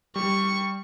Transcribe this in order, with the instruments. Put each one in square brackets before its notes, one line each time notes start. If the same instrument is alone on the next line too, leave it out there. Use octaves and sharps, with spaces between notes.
[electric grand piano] G3 [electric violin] C#6